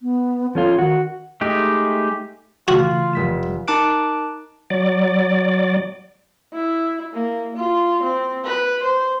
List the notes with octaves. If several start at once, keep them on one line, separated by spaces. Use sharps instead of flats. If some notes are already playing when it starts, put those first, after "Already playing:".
B3
F3 C#4 F4 A4
D#3 F#4
G#3 A3 D#4 G4
C#3 E3 A3 F4 F#4
F1 B6 E7
D#4 A#4 A5 D6 F#6 D7
F#3 D5
E4
A#3
F4
C4
B4
C5